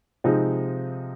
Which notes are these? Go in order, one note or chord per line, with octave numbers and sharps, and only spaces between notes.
C3 F3 G#3 C4 D#4